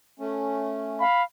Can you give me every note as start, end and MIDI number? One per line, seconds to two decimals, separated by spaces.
0.19 1.03 57
0.19 1.03 61
1.00 1.24 77
1.00 1.23 83